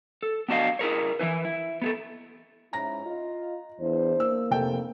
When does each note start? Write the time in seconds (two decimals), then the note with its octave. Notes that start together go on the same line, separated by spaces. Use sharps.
0.23 A4
0.48 B3 D4 F#4 D#5 F5
0.79 E4 G#4 A#4 C#5
1.19 E3 G3 E4 B4
1.45 E4
1.82 B3 G#4 A4
2.73 G#2 C#4 E4 A#5 A#6
3.06 F4 D#5
3.81 E2 D4 E4 C5
4.20 A#3 E6
4.51 F1 C3 A4 G5